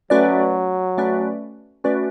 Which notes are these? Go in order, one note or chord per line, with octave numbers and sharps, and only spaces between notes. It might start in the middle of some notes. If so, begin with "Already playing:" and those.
F#3 A3 C#4 F#4 B4 D5
A3 C#4 F#4 B4 D5
A3 C#4 F#4 B4 D5